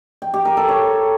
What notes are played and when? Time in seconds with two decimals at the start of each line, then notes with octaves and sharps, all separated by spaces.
0.22 G5
0.34 G4
0.45 A#4
0.57 A4
0.69 C#5